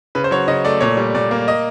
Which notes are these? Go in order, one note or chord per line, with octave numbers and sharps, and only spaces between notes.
C#3 B4
C5
F#3 C#5
C#3 D#5
A3 D5
A#2 C#5
G3
A#2 D5
A#3
D#5